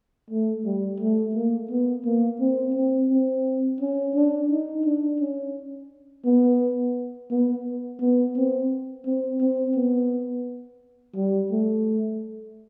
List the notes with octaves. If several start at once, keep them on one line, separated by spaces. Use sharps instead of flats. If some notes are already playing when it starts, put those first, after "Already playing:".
A3
G3
A3
A#3
B3
A#3
C4
C4
C4
C#4
D4
D#4
D4
C#4
B3
B3
B3
C4
C4
C4
B3
G3
A3